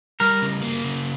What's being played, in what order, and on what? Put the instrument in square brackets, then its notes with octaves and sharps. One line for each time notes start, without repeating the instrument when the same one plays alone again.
[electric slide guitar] G3 [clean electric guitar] A#4
[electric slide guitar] C#3
A#3
C#3